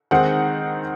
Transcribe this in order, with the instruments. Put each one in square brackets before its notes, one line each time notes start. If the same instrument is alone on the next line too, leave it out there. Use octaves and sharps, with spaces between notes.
[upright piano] D#3 G#3 C4 D#4 F#5